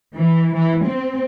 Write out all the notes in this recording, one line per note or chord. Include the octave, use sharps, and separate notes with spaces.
E3
E3
C4